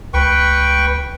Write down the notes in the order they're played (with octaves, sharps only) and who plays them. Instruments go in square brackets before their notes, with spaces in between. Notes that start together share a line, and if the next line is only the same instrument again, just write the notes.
[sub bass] C#2 [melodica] B4 G5 C#6